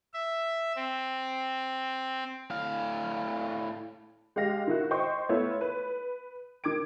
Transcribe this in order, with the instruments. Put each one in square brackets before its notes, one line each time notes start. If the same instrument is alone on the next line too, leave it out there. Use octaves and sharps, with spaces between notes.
[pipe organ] E5
C4
[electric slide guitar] A2 F5
[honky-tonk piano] G#3 G4 F5 A#6
D#3 E4 F#4
C5 D#5 G5 C#6
A3 B3 E4 F4 C#5 E5
B4
D#3 D6 G#6 D7